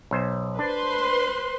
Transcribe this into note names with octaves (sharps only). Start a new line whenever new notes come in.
B1 C5
D4 B4 C5 C6